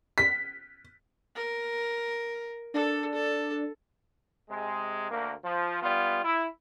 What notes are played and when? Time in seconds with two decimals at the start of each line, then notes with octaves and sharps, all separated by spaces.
0.18 B6
1.35 A#4
2.74 D4 A4
3.15 A4
4.50 C3 G#3
5.10 D2 A#3
5.44 F3
5.82 G3 B3 F4
6.24 E4